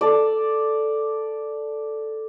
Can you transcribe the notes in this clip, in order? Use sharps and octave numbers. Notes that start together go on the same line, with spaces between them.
A4 D5